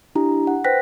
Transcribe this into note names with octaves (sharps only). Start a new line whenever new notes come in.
D4 E4 G4 A#5
F#5
B4 C5 G5 F#6 A#6 B6